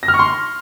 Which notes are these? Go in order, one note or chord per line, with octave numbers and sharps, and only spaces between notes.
A#6
F6
C#6
C6